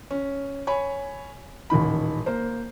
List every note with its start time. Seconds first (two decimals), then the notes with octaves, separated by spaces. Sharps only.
0.11 C#4
0.67 C#5 G#5 B5
1.70 D#1 A1 D#3 B5
2.26 A#3 C5